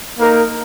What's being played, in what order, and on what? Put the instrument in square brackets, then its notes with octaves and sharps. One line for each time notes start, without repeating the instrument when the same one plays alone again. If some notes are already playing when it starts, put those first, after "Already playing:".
[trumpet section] A#3 D#4 A#4